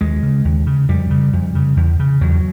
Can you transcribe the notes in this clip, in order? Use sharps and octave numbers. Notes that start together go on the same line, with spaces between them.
D#2 G#3
C#3
D#2
C#3
F2 G3
C#3
F2
C#3
E2
C#3
E2 F#3